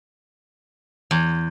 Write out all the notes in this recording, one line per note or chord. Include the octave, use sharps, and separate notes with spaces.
E2